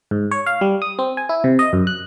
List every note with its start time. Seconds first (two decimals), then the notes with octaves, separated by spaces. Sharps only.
0.11 G#2
0.31 C#5
0.46 F5
0.61 G3
0.82 D#6
0.99 C4
1.17 G#5
1.29 E4
1.44 C3
1.59 D#5
1.73 F#2
1.87 F#6